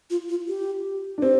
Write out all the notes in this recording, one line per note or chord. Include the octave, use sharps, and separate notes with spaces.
F4
F4
G4
D4
C4 G4